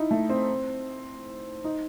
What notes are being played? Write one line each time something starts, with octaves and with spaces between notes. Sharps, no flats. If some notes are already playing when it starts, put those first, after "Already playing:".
Already playing: D#4 E4
A3
C4
D#4